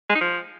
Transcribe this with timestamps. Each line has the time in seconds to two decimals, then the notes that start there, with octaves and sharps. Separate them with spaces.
0.10 G#3
0.15 D#4
0.21 F3